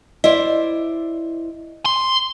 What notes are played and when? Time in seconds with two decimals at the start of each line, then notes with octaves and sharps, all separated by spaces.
0.24 E4 C5 D5 D#5
1.86 C6